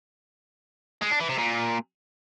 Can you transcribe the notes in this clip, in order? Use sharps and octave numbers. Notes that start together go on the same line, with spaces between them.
G#3
D4
E3
C3
A#2